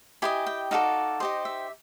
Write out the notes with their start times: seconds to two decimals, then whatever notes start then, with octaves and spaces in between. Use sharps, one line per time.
0.22 E4 G4 B4 D#5 G#5
0.47 G5
0.71 D#4 F#4 A4 D5 F5
1.20 D#4 G4 C5 D#5
1.45 E5